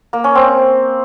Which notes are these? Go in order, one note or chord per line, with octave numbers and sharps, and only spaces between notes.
A#3
C#4
C4